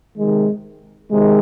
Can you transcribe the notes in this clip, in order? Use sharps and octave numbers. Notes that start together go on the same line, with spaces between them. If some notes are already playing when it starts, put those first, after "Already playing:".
C3 D#3 G#3
C3 D#3 G#3